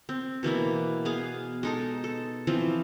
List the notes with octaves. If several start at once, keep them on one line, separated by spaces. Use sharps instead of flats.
C4
B2 E3 A#3 E4
B3 G#4 F5
G#3 D#4 A4
A4
E3 F3 C4